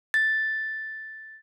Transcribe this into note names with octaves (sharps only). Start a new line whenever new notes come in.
A6